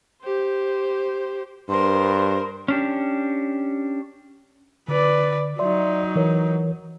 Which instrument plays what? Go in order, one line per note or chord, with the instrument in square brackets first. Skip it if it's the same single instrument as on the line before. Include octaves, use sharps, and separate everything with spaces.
[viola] G4 C5
[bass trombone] G2 [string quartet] A#4 C5 [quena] C6
[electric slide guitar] C#4 D4 G4
[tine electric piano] D3 [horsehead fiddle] B4 D5
[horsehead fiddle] F#3 D#4 [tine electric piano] D5 E5 C6
[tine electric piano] E3 A#4 C#5